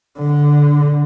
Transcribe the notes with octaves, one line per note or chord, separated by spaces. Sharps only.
D3